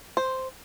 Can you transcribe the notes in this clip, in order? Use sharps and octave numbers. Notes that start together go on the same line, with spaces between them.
C5